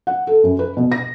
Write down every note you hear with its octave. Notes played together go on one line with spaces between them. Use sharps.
F#5
A4
F#2
B4
B2
A#6